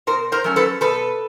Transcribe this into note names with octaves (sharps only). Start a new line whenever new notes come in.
B2 A#4 C5
A#4 C5
F#3 A3 C#4
A4 B4
B2 A4 B4